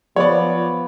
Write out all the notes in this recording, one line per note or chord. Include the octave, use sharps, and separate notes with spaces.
F3 B3 C#5 D5